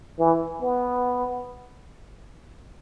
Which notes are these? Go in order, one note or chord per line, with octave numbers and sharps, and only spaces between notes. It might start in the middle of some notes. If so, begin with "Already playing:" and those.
E3
B3